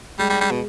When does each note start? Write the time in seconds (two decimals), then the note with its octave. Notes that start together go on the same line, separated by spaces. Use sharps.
0.19 G3 G#3
0.30 G3
0.41 G3
0.51 B2